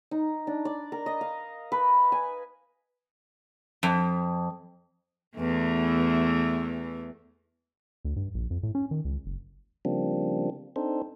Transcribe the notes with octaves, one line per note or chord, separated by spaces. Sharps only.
D#4
D4
D5
A#4
D#5
F5
B4
G#5
F2
E2 E3 A3
D2
G2
A#1
F2
A2
C#4
D#3
C#2
F#1
C#3 F3 G3 A#3 C4 D4
C4 D4 D#4 A4 C5